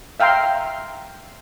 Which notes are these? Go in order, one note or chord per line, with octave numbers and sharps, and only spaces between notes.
E5 F5 G5 A#5 C6